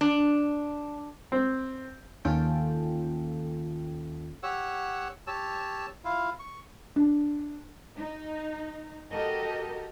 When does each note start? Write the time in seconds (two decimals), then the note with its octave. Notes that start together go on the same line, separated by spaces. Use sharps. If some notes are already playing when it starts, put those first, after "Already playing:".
0.01 D4
1.32 C4
2.25 D#2 C#4 F4 A4 G5
4.43 G4 C#5 F#5 E6
5.27 G4 C#5 A5 E6
6.05 E4 F4 F5
6.39 C#6
6.96 D4
7.98 D#4
9.12 F#4 G4 A4 A#4 D#5